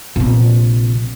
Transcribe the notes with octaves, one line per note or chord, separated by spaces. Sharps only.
A#1 C3